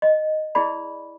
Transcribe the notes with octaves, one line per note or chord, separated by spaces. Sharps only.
D#5
E4 G#4 D5 B5